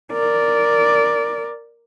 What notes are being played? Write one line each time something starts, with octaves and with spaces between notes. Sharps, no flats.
A#4 D5